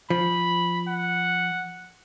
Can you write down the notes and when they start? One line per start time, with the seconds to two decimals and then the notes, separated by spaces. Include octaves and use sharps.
0.10 F3 B5
0.88 F#5